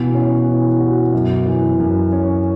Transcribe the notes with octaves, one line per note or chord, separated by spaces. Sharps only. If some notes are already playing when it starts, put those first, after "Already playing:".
Already playing: B2 E3
C#4
E3
F#4
F#2
E3
F#2
C#4